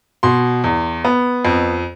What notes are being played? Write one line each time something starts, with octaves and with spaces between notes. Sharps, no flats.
B2 C6
E2
B3
F2